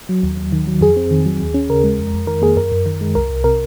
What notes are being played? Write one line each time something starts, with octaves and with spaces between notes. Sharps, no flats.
F#3
D#2
D#2
D#3
F#3
F2 G#4
C4
D#3
F#3
D#2
C#4
C#3 A#4
G#3
F2
F2
D#3 A#4
A#3 G#4
F#2 A#4
F#2
D#3
G#3
C2 A#4
C2
C3 A#4